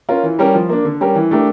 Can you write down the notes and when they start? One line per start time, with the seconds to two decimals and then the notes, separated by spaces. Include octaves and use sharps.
0.09 C#4 F4 A#4
0.23 E3
0.39 G3 C#4 G4 A#4
0.55 F3
0.69 A#3 D4
0.85 D3
1.01 G3 C#4 G4 A#4
1.15 E3
1.31 A3 D4 G4 A#4